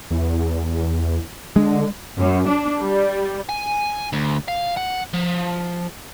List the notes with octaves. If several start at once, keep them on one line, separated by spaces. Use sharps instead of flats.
E2
D3 G#3
F#2
D4
G3
G#5
D2
F5
F#5
F3